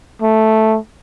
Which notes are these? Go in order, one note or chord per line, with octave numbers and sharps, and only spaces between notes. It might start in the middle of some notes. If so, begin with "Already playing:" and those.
A3